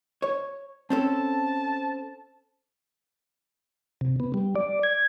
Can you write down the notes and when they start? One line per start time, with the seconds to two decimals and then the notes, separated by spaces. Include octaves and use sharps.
0.22 C#5
0.90 C4 C#4 A4 A5
4.01 C3
4.20 B3
4.34 G3
4.56 D5
4.83 G#6